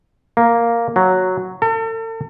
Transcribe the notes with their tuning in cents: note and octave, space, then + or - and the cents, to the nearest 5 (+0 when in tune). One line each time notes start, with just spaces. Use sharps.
A#3 +0
F#3 +0
A4 +40